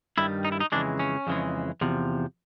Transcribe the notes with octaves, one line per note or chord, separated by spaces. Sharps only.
G2 D#3 G3 E4
D#4
E4
D#4
F2 C#3 E3 G#3 D4
C#4
F2 C#3 E3 G#3
E2 C3 F3